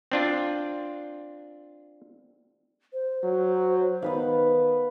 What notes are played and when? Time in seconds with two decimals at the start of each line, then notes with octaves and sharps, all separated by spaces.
0.12 C4 D4 F4
2.93 C5
3.24 F#3
4.02 D#3 B3 B4 F5